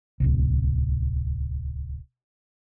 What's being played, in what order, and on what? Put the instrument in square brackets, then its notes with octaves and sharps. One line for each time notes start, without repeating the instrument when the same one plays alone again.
[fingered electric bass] D1 G1 C2